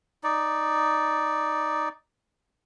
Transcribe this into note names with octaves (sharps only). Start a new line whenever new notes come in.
D#4 D5